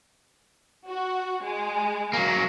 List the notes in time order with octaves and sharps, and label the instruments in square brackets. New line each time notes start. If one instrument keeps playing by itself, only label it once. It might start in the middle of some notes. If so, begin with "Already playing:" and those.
[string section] F#4
G#3
[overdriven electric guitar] F#3 A#3